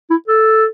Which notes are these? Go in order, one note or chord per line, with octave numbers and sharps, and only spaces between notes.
E4
A4